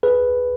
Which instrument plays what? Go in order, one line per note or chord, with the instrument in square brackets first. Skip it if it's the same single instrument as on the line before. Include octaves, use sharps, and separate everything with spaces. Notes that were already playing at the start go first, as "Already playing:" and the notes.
[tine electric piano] G#4 B4